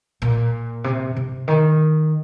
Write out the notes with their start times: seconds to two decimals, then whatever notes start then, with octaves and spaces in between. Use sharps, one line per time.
0.22 A#2
0.84 C3
1.16 C3
1.48 D#3